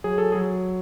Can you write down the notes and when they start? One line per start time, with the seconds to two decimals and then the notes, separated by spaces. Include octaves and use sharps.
0.04 F#3 G#4
0.18 A4
0.32 F#3 G#4